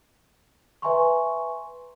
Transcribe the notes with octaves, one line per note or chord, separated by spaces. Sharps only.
B4 E5 G#5 A#5 C6 C#6